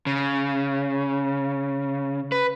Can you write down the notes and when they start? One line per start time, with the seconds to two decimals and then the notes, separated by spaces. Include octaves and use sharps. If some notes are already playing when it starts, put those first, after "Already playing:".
0.06 C#3
2.32 B4